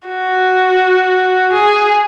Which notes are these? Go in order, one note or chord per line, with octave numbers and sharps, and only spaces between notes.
F#4
G#4